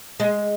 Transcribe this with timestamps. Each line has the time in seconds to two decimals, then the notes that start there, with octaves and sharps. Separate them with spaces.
0.20 G#3